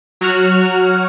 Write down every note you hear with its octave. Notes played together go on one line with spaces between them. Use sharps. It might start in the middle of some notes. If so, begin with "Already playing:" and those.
F#3 F#4 F6